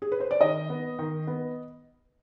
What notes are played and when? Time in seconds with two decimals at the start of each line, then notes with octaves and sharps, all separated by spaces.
0.02 G#4
0.12 B4
0.20 C5
0.31 D5
0.41 D#3 D#5
0.70 B3
0.99 D#3
1.27 B3